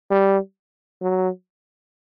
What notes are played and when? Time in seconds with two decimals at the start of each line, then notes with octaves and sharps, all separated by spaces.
0.11 G3
1.02 F#3